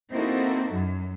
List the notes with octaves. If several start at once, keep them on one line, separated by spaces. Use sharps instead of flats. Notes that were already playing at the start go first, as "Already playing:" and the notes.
A#3 C4 D#4 E4 F#4 A4
F#2 F#3